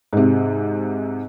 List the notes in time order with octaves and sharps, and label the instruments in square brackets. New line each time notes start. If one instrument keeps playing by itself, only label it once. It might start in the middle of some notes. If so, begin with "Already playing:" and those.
[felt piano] G#2 C3